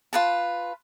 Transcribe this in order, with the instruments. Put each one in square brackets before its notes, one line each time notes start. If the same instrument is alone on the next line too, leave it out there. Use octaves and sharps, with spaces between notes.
[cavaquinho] F4 B4 A5